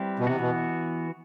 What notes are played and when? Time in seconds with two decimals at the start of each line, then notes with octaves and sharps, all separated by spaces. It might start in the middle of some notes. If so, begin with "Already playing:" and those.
Already playing: G3 C4 E4 G4 B4
0.19 B2
0.27 C3 E3 B3 F#4
0.41 B2